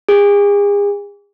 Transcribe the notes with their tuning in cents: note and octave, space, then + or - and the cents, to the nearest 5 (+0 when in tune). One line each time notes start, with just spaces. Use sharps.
G#4 -40